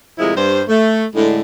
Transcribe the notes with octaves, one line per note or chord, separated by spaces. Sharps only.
A2 C3 F3 G#3 E4 A#4
G2 C5
A3
A2 D3 G#3